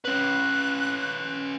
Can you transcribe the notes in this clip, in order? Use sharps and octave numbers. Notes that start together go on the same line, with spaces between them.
C#4 B4 F#6